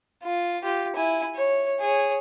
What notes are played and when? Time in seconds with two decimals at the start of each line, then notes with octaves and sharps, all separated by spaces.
0.24 F4
0.63 F4 G4
0.96 E4 G#5
1.35 C#5
1.80 G#4 C#5